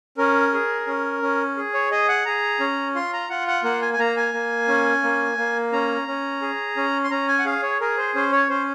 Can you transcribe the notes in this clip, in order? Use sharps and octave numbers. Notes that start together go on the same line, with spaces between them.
C#4 A#4
G#4
C#4
C#4
G#4
C#5
G#4 D#5
F#5
G#4 A#5
C#4
F4 C6
A#5
F4 F#5
F#5
A#3 F#5
G#5
G#5
A#3 A#5
G#5
A#3
C#4
A#3
A#3
C#4 A#5
C#4
G#4
C#4
C6
C#4 A#5
G#5
F#5
G#4 F5
C#5
G#4 A#4
C5
C#4 C5
C#5
C#4 C5